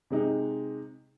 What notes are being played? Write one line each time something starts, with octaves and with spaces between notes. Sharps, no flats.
C3 G#3 D#4